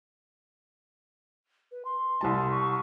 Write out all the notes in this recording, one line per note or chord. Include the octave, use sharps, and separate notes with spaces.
B4
C6
C2 G3 A5
C#6